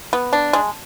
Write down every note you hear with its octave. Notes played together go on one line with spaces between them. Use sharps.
B3
D4
G#3